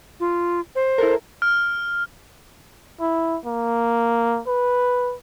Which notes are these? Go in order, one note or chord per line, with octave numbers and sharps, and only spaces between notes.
F4
C5
E4 A4 A#4
F6
E4
A#3
B4